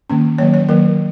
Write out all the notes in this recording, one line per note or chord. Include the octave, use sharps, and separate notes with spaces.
D#3 A#3 C#4
D#3 F#3 A#3 C#5
C#5
D#3 F#3 A#3 A#4